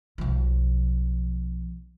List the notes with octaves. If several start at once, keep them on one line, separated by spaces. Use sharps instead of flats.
B1 F3